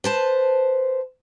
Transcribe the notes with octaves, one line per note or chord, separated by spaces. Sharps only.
B4 C5 A5